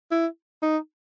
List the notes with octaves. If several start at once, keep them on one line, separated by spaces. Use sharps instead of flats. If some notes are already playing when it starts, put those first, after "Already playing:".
E4
D#4